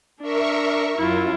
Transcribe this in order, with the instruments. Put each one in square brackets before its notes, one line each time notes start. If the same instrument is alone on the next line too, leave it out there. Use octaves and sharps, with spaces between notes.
[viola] D4 [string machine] A#4 E5 C#6
[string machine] F#2 [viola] E4 F4